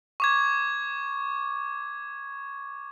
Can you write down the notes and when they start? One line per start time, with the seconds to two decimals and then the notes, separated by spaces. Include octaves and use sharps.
0.20 C#6 D6 G#6